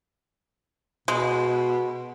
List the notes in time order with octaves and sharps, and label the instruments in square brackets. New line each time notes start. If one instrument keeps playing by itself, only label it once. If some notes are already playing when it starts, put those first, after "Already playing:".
[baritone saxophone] B2 [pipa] G#3